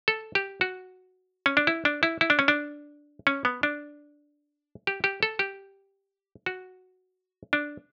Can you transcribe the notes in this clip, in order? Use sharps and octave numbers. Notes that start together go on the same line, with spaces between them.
A4
G4
F#4
C#4
D4
E4
D4
E4
E4
D4
C#4
D4
C#4
B3
D4
G4
G4
A4
G4
F#4
D4